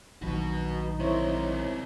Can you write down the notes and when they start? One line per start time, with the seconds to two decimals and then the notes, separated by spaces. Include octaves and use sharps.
0.22 A#1 D#3 F#3 D#4 F#4 B4
0.99 C3 E4 A#4 C5 C#5